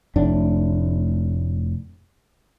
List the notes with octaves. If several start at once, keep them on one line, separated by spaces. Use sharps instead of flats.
F1 A2 D4